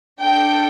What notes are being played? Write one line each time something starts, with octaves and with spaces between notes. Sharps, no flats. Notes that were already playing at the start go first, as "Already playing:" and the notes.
D4 A4 G5